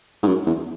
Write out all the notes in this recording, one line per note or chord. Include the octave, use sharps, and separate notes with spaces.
G#2
F#2
E2